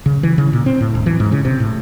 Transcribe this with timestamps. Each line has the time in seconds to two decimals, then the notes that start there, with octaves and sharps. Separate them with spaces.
0.06 C#3
0.23 E3
0.38 C#3
0.53 A#2
0.66 C4
0.81 A2
0.95 D#1
1.06 E3
1.20 G#2
1.32 C#3
1.45 C3
1.60 A2